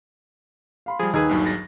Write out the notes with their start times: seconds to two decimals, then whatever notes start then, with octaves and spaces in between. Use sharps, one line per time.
0.86 F5 B5 C6
0.99 F3 G3 G#4
1.14 D#2 D#3 G#4 A#4 B4 E6 G#6
1.29 A#1 G2 F#3
1.45 A6 A#6